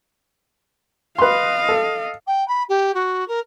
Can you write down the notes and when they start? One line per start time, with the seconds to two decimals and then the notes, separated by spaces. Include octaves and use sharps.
1.18 B4 D#5 F5 C6
1.69 A4
2.27 G5
2.48 B5
2.69 G4
2.94 F#4
3.27 A#4